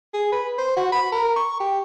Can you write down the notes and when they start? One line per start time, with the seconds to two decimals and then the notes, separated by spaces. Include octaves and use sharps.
0.14 G#4
0.32 B4
0.58 C5
0.77 F#4
0.92 B5
1.12 A#4
1.36 C#6
1.60 G4